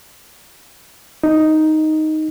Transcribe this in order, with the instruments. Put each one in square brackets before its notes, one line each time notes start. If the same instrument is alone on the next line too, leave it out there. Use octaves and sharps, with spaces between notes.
[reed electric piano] D#4